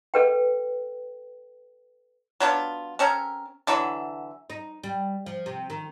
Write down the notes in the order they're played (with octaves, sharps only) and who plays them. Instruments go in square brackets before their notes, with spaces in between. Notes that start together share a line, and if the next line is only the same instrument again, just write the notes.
[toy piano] A4 B4 G5
[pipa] F#3 B3 D4 F4
C4 C#4 A4 A#4
D3 E3 F#3 E5
[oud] D#4
G3
F3
C3
D#3